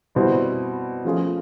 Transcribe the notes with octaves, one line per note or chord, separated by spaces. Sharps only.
B2 G3 C4 E4
F3 A3 C#4 F4 G#4